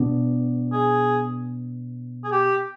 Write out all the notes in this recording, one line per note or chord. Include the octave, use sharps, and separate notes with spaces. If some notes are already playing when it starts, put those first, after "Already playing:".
Already playing: B2 B3 D4
G#4
G#4
G4